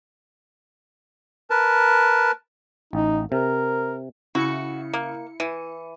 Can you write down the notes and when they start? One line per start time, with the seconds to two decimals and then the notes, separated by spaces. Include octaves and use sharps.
1.50 A#4 B4 A5
2.93 A1 D#4
3.32 C3 A#4
4.35 C#3 E4 F#4 C#7
4.93 A#3
5.40 E3 D#7